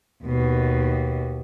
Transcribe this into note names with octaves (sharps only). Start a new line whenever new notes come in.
D#2 B2